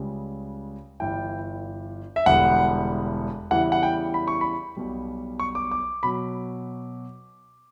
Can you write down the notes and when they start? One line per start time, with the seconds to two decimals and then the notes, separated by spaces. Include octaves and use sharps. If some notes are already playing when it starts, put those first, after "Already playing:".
Already playing: C#2 C#3 G3
1.00 G1 G2 E3 G5
2.16 E5
2.26 E1 E2 D3 G3 F#5
3.51 E2 C#3 E3 G3 F#5
3.72 F#5
3.83 G5
4.14 B5
4.28 C#6
4.41 B5
4.77 B1 B2 G3
5.40 C#6
5.55 D6
5.71 D6
6.03 B2 F#3 B5